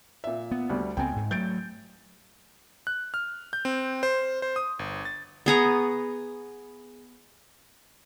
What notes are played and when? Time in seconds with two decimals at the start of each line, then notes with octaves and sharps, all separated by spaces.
0.24 A#2 E5
0.51 B3
0.70 D2 G3
0.97 C#2 B3 C4 G5 G#5
1.16 G#2
1.31 F#3 A3 G6 A6 D7
2.87 F#6
3.14 F6
3.53 G6
3.65 C4
4.03 C5
4.42 C5
4.56 D#6
4.79 G1
5.05 A6
5.46 B3 G#4 A#5 C#6